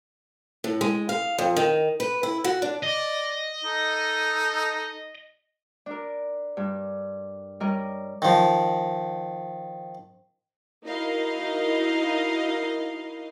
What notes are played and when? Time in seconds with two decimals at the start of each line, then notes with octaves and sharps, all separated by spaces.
0.64 A2
0.81 G#3
1.09 F5
1.38 F2
1.56 D#3
2.00 B4
2.23 E4
2.44 F#4
2.62 D4
2.83 D5 D#5
3.64 D#4 A4
5.86 D4 A#4
6.57 G2
7.60 G3 C#4 A#4 D#5
8.22 D#3 F3
10.86 D#4 E4 F#4 A#4 D#5 F5